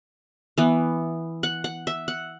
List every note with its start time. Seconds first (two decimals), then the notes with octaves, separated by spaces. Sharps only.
0.58 E3 B3
1.43 F#5
1.64 F#5
1.87 E5
2.08 F#5